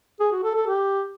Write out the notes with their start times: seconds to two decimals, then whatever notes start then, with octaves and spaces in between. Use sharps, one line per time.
0.20 G#4
0.32 F#4
0.43 A4
0.55 A4
0.67 G4